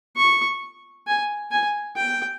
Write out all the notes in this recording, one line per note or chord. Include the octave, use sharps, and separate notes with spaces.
C#6
G#5
G#5
G5